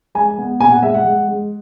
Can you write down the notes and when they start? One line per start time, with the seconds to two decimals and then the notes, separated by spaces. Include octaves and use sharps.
0.15 G#3 G#5
0.38 B3
0.60 A#2 G#5
0.72 F#5
0.83 G#3 E5
0.94 F#5
1.05 G#3
1.28 G#3